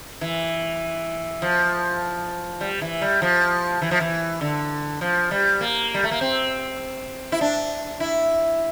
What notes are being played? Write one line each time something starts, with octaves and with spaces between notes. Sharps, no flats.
E3
F3
G3
E3
G3
F3
E3
F3
E3
D3
F3
G3
A#3
G3
A3
A#3
C4
E4
D4
E4